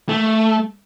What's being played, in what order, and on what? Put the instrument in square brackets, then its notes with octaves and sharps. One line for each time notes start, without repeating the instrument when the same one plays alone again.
[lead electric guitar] A3